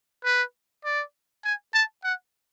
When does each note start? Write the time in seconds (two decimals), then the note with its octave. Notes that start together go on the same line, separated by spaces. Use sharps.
0.24 B4
0.84 D5
1.44 G#5
1.74 A5
2.04 F#5